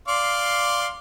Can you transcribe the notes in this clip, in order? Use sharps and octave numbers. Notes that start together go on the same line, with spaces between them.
D5 F5 C6